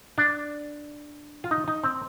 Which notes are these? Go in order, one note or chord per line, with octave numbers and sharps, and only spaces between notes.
D4
F4
D#4
D#4
C4